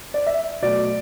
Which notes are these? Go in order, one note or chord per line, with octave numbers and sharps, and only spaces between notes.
D5
E5
B2 F#3 A3 D5